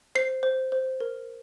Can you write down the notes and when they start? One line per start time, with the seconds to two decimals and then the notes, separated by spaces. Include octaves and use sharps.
0.15 C5 C7
0.43 C5
0.72 C5
1.00 A#4